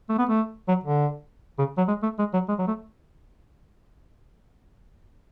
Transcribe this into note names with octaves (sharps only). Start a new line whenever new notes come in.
A3
B3
A3
F#3
D3
C#3
F#3
G#3
A3
G#3
F#3
G#3
F#3
A3